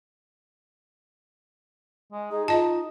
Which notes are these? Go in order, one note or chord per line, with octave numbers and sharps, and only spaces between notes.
G#3
D#4 G#4
F4 D#5 A5